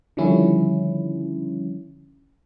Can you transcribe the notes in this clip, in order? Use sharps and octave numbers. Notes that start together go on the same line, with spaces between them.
D3 D#3 F3 G3 C#4 E4